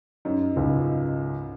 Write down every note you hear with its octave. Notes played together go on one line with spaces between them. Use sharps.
F#2 D#4
C#2 G#2